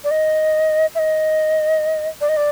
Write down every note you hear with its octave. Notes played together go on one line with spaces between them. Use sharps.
D5
D#5
E5
D#5
D5
D#5
D5